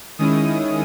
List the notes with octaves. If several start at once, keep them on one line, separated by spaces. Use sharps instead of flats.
D#3 G#3 C#4 E4 D#6